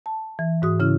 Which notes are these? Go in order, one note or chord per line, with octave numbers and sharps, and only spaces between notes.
A5
E3
G#2 F#4 D#6
C#3 C#4 E4 F6